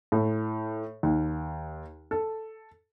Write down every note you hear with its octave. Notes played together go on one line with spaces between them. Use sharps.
A2
D#2
A4